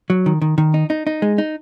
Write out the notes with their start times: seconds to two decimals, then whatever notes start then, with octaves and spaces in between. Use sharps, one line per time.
0.10 F#3
0.26 D#3
0.42 D#3
0.58 D#3
0.74 D#4
0.90 D#4
1.07 D#4
1.22 G#3
1.38 D#4